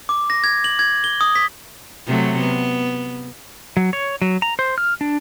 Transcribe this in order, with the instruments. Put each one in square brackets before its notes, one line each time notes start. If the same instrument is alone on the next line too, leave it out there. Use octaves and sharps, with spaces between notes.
[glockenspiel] D6
A#6
G#6
F#7
G#6
G7
D#6
B6
[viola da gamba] C3 F#3 A3
B3
[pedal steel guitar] F#3
C#5
F#3
A#5
C5
F6
D4